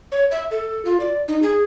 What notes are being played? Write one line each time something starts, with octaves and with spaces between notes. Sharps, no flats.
C#5
E5
A4
F4
D5
D#4
G#4